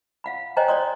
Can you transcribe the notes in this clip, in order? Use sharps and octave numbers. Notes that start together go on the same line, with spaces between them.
F5 F#5 B5
C5 C#5 D#5 G5 G#5 A#5
C#5 D5 C6 D#6